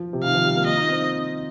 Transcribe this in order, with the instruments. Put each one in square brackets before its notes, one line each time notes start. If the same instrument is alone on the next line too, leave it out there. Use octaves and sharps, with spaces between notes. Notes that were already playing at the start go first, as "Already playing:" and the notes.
Already playing: [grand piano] F3
C3
[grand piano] D#3 [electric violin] F5
[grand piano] F3
G3
A#3
[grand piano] F4 [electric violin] D#5
[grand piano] D#4
C4